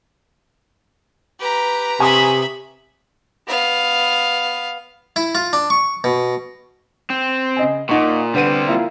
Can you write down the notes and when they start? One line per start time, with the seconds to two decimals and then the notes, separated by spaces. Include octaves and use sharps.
1.40 G4 B4 A#5
2.00 C3 E5 G#5 B5 C#6 D#6
3.47 B3 F5
5.16 E4
5.35 F4
5.53 D4
5.70 C#6
6.04 B2
7.10 C4
7.57 C#3 D#5 G#5
7.89 A#2 D#4 F#5 C#6
8.34 D3 G3 B3 C4 D#7
8.67 A#3 E4 F4